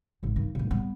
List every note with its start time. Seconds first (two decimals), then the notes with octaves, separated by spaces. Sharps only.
0.23 G#1 G#2
0.36 G2 D#3
0.55 G2 A#2
0.71 G3 B3